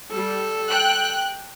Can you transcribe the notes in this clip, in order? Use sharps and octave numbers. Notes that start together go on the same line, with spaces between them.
G3 A4
G5 F#6